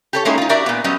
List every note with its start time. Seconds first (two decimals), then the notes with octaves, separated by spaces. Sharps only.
0.13 G4 A4 C#5
0.25 G#3 A#3 C#4 D#4 E4 A#4
0.38 D#4 F4
0.49 D4 F#4 G4 A#4 D5 E5
0.66 A#2 B3
0.84 F#3 G3 B3 C#4 D#5